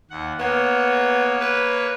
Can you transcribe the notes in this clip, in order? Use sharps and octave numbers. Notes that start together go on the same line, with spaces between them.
D#2 F#5
A#3 B3 C#5
B4